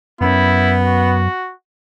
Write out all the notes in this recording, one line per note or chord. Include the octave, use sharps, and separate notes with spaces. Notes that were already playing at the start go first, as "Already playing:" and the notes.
F#2 B3 E4
F#4